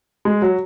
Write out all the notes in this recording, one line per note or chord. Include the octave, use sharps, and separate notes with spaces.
G#3
F#3